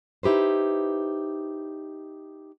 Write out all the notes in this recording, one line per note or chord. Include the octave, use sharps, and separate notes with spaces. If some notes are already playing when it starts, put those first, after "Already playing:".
D#4 E4 G4 B4 C5